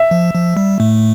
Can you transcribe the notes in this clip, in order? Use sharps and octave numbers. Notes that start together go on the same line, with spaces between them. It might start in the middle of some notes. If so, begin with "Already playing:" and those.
Already playing: E5
F3
F3
G3
A2 A3